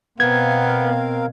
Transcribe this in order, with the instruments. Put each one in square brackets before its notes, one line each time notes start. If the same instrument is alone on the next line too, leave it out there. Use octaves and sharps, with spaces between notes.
[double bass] B2 [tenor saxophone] B3 [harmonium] C4 A#4 F5 [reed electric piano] G#6